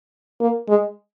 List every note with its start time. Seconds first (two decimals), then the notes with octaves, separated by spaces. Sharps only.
0.41 A#3
0.69 G#3